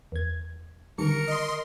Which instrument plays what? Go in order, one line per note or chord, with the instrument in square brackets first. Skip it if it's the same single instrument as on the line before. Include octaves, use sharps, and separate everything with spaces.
[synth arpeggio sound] E2 G#6
[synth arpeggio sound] D3 D#3 G3 [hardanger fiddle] A#4 [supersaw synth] C#7
[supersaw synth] D#5 C6